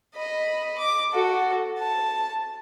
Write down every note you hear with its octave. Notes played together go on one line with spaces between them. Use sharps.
D#5 B5
D6
F#4 A4
A5